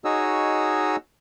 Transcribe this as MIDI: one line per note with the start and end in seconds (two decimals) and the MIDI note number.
0.05 0.96 63
0.05 0.96 66
0.05 0.96 68
0.05 0.96 73
0.05 0.96 75
0.05 0.96 88